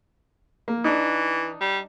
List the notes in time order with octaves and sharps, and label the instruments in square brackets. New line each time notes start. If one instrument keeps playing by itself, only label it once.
[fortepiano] A#3
[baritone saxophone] E3 [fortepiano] D4 D#4
[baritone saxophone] G3